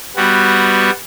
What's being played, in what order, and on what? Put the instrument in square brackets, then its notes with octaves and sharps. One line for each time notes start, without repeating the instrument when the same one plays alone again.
[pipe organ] G3 B3 F#4